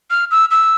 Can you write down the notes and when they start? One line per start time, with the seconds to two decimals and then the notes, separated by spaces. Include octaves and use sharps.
0.10 F6
0.31 E6
0.51 E6